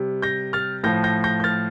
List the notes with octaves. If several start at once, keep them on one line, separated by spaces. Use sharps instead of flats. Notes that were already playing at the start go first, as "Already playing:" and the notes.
Already playing: C3 G3
G6 A#6
F6 A6
A2 F3 G6 A#6
G6 A#6
G6 A#6
G6
F6 A6